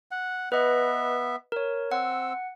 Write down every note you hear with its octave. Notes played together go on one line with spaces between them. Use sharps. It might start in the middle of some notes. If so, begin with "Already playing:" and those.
F#5
B3 B4 D#5 E5
A#4 C#5
C4 F#5 E6